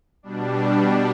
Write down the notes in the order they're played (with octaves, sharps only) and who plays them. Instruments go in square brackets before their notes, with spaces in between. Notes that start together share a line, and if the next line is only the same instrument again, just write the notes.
[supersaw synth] B2 G3 D4